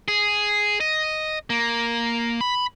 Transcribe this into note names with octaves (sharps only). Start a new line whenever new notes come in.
G#4
D#5
A#3
B5